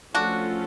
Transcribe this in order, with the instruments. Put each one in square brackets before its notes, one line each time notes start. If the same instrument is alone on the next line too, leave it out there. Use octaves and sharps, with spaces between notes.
[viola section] F3 A3 C#4 F4 A4 [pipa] D4 F#4